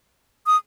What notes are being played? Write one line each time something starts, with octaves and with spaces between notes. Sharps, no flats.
D#6